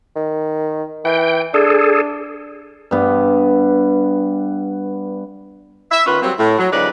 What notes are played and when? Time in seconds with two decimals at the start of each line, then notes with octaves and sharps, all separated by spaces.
0.16 D#3
1.05 E3 G5
1.54 D4 G#4 A4
2.91 G2 B3
5.91 E5
6.07 D#3 B3 C#4 F4 B4
6.22 F#3 G3 A#3 C4
6.39 A2
6.58 F#3
6.72 C#3 F3 G3 D#4 B4 D5